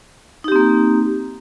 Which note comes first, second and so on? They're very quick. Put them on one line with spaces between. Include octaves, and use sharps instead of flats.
D#4 G4 C4 A#3